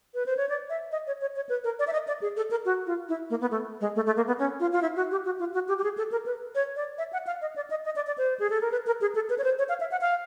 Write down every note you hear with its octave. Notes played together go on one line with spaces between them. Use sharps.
B4
C5
C#5
D5
E5
D#5
C#5
C#5
C#5
B4
A#4
D5
E5
D#5
D5
G#4
A4
A#4
F#4
F4
E4
A#3
B3
A3
G#3
A3
A3
A#3
B3
C#4
F4
F4
E4
F#4
G4
F#4
F4
F#4
G4
G4
G#4
A4
A#4
B4
C#5
D5
E5
F#5
F5
D#5
D5
D#5
D#5
D5
D5
C5
G#4
A4
A#4
B4
A#4
G#4
A4
B4
C#5
C5
C#5
F5
E5
F#5
F5